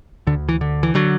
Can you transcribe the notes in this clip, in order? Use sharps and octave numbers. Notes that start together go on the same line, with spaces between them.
D2 D3
E3
D3
E3
D3 F#3